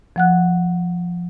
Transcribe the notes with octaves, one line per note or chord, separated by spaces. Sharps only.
F3 F#5 F#6